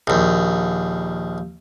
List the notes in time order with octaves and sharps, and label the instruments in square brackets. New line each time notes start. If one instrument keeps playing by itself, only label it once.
[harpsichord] A#1 D#2